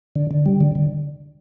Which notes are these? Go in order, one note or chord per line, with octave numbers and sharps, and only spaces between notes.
D3
D3
G3
D3
D3